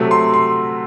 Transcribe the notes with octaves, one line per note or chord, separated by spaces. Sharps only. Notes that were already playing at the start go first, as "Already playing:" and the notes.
Already playing: C3 F#3 A3
C6
C6